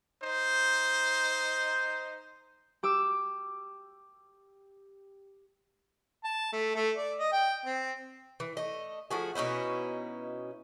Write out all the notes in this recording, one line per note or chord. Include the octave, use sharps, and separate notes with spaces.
D#4 C5
G4 D6 E6
A5
A3
A3
D5
D#5
G5
C4
E3
A3 D#5
F3 A3 F#4 G#4
B2 C#4 D#4 E4